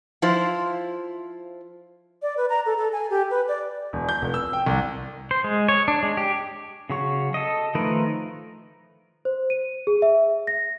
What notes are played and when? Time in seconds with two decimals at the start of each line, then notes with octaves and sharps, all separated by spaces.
0.22 F3 E4 F4 C5
2.22 D5
2.37 B4
2.50 A#5
2.66 A4
2.77 A4
2.93 G#5
3.10 G4
3.31 B4
3.48 D5
3.93 E1
4.09 G6
4.22 F1
4.34 E6
4.53 G5
4.66 C2
5.31 C5
5.44 G#3
5.69 C#5
5.88 D4
6.03 G#3
6.17 G4
6.89 C#3 F#3 C#6
7.34 A4 D#5
7.75 D#3 F3 A3 A#4 B4
9.25 C5
9.50 D#7
9.87 G#4
10.02 E5
10.47 A#6